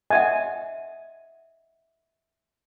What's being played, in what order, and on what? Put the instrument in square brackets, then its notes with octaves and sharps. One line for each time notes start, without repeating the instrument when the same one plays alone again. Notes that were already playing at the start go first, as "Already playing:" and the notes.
[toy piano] D#5 E5 F#5 [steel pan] G#5